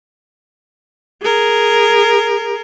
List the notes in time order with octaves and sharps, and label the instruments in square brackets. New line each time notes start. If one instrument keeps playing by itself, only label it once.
[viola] G#4 A#4